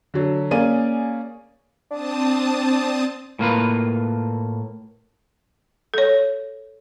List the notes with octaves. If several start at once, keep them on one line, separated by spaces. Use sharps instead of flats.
D3 F#3
A#3 C#4 G#4 D5 D#7
C4 D4 A5 D#6
A2 A#3 F4 B4
A4 C#5